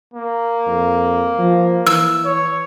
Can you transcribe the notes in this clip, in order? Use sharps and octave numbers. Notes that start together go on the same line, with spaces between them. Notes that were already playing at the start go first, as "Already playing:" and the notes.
A#3
F2
F3
E3 E6
C#5